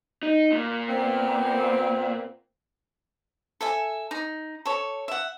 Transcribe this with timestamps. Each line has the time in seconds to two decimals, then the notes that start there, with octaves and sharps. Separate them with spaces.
0.23 D#4
0.52 A#2
0.88 B3 C4
3.61 A4 E5 G#5
4.11 D#4
4.65 A4 C#5
5.08 E5 F#5